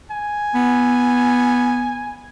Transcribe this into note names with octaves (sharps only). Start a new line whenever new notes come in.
G#5
B3